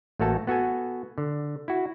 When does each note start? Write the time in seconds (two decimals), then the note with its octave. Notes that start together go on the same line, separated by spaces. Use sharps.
0.19 A1 A3 A#3 F#4 A4 A5
0.47 B3 F#4 A4 G#5
1.18 D3
1.68 E4 F#4